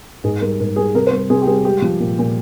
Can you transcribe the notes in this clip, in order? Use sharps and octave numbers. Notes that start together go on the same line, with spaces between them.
G#2 G#4
G3 A#4
G#2 A#4
G3 G#4
C3 A#4
C5
G3 A#4
C3 G#4
G4
G3 G#4
G#3 G4
F3
A#2
A#2